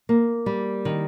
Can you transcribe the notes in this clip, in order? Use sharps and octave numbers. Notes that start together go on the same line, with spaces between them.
A#3
G3
D#3